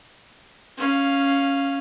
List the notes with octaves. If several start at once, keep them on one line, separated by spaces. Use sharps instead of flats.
C#4 F5